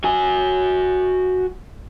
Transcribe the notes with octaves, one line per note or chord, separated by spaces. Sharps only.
F#4 G#5